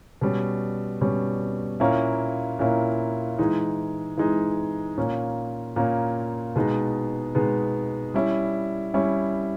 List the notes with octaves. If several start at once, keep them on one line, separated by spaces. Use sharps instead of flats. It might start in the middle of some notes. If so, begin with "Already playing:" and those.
B2 G3 C#4
B2 G3 C#4
A#2 A#3 C#4 E4
A#2 A#3 C#4 E4
E3 G#3 D#4
E3 G#3 D#4
A#2 A#3 C#4
A#2 A#3 C#4
B2 G#3 B3 D#4
B2 G#3 B3 D#4
G3 C#4 E4
G3 C#4 E4